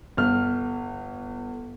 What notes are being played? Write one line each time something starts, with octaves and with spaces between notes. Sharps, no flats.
G1 F6